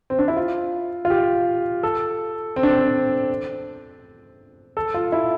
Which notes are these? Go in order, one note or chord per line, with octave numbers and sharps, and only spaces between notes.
C4
D4
E4
F4
F4
G4
A4
C4
D4
C4
A4
F4
E4